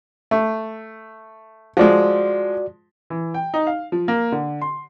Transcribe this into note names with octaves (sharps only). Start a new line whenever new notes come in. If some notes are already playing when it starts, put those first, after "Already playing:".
A3
F3 G#3 F#4 D5
E3
G5
D#4
F5
F3
A#3
D3
C6